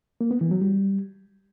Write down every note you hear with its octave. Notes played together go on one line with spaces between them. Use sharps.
A#3
B3
E3
F#3
G3